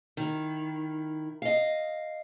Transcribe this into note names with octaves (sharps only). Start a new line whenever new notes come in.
D#3 E4
D#5 F5